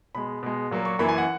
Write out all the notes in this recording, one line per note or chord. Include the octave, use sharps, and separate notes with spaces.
B2 G#3 B5
B2 G#3
A#2 F#3 A#3
C#6
F#2 E3 A#3 B5
G#5
F#5